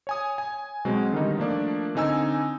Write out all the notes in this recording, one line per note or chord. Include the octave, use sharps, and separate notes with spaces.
C#5 G#5 D#6
G#5
B2 F#3 G#3 C4
D3 D#3 G3 D#4
F3 A3 A#3 D4 D5
D3 C4 D#4 G#5 E6